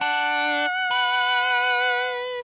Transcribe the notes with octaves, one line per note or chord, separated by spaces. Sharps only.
D4 F#5
B4